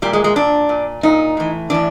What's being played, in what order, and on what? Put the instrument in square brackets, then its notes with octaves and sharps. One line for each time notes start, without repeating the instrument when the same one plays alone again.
[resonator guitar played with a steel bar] A#2 G3
G#3
G#3
A#2 D4
A#2
A#2 D#4
A2 E3
A2 E3 D4